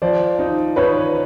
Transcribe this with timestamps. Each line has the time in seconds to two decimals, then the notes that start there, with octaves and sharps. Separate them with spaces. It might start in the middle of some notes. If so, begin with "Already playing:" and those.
0.02 F3 C5 D5
0.39 D#4
0.76 D#4 B4 C#5